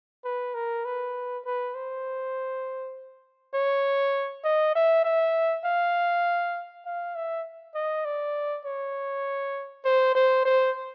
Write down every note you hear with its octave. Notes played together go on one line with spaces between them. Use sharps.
B4
A#4
B4
B4
C5
C#5
D#5
E5
E5
F5
F5
E5
D#5
D5
C#5
C5
C5
C5